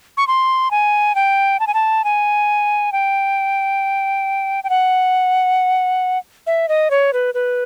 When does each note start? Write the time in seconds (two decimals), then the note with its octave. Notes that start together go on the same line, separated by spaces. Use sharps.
0.17 C#6
0.27 C6
0.71 G#5
1.15 G5
1.60 A5
1.67 G#5
1.74 A5
2.04 G#5
2.92 G5
4.64 G5
4.70 F#5
6.47 E5
6.69 D#5
6.91 C#5
7.13 B4
7.34 B4